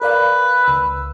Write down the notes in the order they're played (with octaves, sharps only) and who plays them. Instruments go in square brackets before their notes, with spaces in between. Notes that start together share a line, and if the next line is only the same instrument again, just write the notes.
[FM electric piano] A#4 D5 F5 [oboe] B4
[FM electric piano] C#2 E6